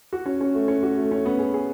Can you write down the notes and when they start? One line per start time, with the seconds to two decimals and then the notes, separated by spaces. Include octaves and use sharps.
0.13 F#4
0.26 C#4
0.41 C#4
0.55 A3
0.68 C#4
0.83 F#4
0.97 A3
1.11 C#4
1.26 B3
1.39 G#4
1.54 G#4